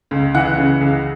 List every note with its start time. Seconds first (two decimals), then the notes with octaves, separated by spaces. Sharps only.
0.11 C#2
0.35 E3 F#5
0.58 C#3
0.81 C#2